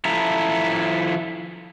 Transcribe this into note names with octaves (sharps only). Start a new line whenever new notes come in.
F3 E4 A4 E5 A#5